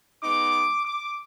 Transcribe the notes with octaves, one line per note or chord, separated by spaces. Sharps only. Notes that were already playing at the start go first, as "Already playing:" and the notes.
G#3 B3 D#4 D6
D6